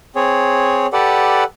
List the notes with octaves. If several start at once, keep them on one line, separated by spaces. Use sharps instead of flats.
C4 G#4 C#5
G4 A4 B4 D5 F#5